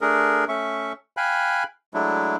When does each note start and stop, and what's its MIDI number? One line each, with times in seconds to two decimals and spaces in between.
0.01 0.45 57
0.01 0.45 62
0.01 0.45 68
0.01 0.45 70
0.48 0.93 57
0.48 0.93 61
0.48 0.93 76
0.48 0.93 85
1.17 1.64 77
1.17 1.64 79
1.17 1.64 80
1.17 1.64 83
1.17 1.64 90
1.94 2.36 54
1.94 2.36 56
1.94 2.36 57
1.94 2.36 62
1.94 2.36 64